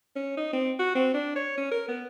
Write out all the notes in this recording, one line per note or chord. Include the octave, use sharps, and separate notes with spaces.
C#4
D#4
C4
F#4
C4
D4
C#5
C#4
A#4
B3